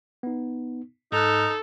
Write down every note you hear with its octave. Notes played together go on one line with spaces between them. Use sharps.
B3 D#4
G#2 D#4 A4 F#6